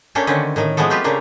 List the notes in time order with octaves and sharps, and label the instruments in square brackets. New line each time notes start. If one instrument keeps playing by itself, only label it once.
[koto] A3 A#3 C#4 D4 G4 A4
D3 D#3 C4 C#4 B4
A2 D#3 A3
F3 G#3 A3 B3 A4
C4 F4 G4 B4 E5
C#3 A3 A#3 D4 A#4